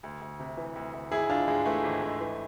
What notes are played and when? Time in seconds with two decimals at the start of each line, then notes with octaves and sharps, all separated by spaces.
0.03 D2
0.21 D2
0.40 C3
0.57 E3
0.76 D2
0.93 D2
1.11 G#1 E4 G#4
1.30 G#1 D4 F4
1.47 G#2 G#3
1.66 E3 A3
1.84 G#1
2.02 G#1
2.20 E3